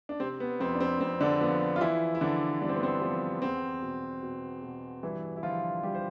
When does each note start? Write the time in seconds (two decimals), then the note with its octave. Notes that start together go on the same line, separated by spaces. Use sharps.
0.09 D4
0.20 C3 C4
0.40 B3
0.60 F2 C4
0.74 D4
0.80 C4
1.01 F2 C4
1.20 D3 D4
1.41 F3 B3
1.76 F4
1.81 E3 F3 E4
2.15 E4
2.21 D3 F3 D4
2.61 G2 D4
2.69 C4
2.76 B3
2.83 C4
3.01 F3 B3
3.42 E2 C4
3.82 B2
4.23 B2
4.63 B2
5.03 G2 E3 E4
5.36 E4
5.43 D3 F3 F4
5.83 G2 G3 G4
5.95 C5